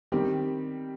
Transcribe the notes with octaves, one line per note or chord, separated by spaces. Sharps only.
D#3 G3 C4 G4